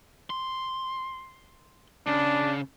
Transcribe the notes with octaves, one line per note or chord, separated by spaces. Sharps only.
C6
C#3 D4